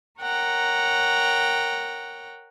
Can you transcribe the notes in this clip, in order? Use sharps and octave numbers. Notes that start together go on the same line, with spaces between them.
A#4 C#5 F#5 G5 A#5